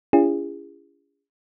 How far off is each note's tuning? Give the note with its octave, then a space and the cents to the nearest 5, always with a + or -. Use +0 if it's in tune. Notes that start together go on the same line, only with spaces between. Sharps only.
C#4 +45 E4 +45 G#4 -30